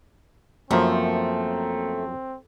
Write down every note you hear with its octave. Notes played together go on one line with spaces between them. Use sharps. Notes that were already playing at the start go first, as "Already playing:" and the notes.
F#2 F3 A3 A#3 C4 A#5